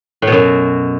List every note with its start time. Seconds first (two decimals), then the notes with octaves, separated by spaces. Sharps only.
0.22 A2
0.27 B2
0.32 F#2